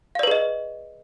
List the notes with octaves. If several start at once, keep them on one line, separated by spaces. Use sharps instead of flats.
G#4 B4 D5 D#5 F5